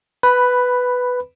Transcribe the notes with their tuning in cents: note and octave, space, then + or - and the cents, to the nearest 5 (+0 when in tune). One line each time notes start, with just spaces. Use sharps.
B4 +5 B5 -5